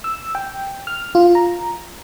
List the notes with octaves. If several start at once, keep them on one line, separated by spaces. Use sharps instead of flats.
E6
G5
F6
F4
A#5